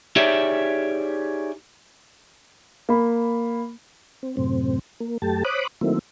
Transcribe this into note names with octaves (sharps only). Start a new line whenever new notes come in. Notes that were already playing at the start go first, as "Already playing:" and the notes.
D#4 G4 G#4 C#5 D5 E5
A#3 B5
C4
F#2 A2 C3 C4
A#3
F#2 A3 G4 A5
C5 C#5 B5 D6 D#6 F#6
D#3 F#3 A3 A#3 C4 E4